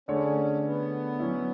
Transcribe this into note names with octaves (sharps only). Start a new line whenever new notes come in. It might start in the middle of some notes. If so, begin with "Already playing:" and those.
D3 A3 C#4 D4 G#4 C#5
B3
F#3 C#4 E4